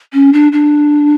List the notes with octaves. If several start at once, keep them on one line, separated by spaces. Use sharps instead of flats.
C#4
D4
D4